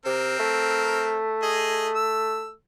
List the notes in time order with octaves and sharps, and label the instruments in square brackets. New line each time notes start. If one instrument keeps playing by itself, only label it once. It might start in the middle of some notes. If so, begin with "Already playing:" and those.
[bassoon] C3 [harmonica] C4 A#4
[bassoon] A3
[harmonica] G#4 D#5
E6